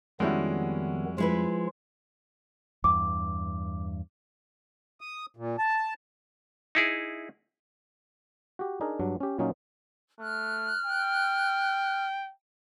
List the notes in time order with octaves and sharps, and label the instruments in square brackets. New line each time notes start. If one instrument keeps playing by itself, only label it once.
[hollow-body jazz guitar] F2 G3 F#4 [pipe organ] D#3 B3 [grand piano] G#3 C#4 E4
[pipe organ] F3 F4 [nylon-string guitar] G#3 E4 B4
[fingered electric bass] E2 G2 [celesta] D6
[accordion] D#6
A#2
A5
[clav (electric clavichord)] D#4 E4 G#4
F#4 G4
D4 D#4 G#4 A#4
G2 F#3 D4
C#4 G4
A#2 F#3 C#4 D#4 F4
[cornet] A3 [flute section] F6 F#6
[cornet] G5